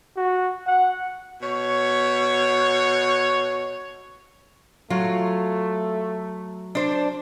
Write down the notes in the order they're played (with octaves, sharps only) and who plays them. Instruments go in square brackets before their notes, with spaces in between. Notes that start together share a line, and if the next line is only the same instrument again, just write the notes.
[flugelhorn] F#4
F#5
[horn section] B2 C#5
[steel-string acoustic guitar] F#3 [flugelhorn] A3 [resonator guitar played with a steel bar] F4
[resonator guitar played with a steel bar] D4 C5